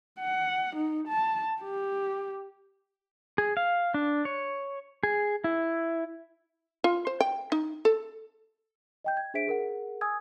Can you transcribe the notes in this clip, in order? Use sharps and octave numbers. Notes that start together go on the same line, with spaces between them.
F#5
D#4
A5
G4
G#4
F5
D4
C#5
G#4
E4
F4
C5
G5
D#4
A4
D#5 G5 G6
G#6
D4 G#4 C5 E5 B6 D7
G#4 A#4 F#5
G#5 D#6 E6 G#6